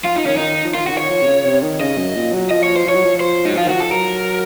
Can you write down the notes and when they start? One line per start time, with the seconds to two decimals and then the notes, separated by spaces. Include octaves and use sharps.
0.04 F3 F4
0.16 F3 D#4
0.26 D#3 C#4
0.37 D#3 D#4
0.64 F3
0.74 D#3 F4
0.87 C#3 F#4
0.92 D#3
0.98 C#5
1.10 F3
1.22 C3
1.27 C#3
1.45 C3
1.63 D#3
1.81 C#3 D#5
1.98 F#2
2.16 A#2
2.33 F#3
2.51 F3 D#5
2.63 C#5
2.76 C5
2.86 F3 C#5
2.95 F#3
3.05 F3
3.21 C5
3.45 F#3 D#4
3.57 F3 F4
3.65 D#3
3.69 F#4
3.74 F3
3.80 A4
3.91 F#3 A#4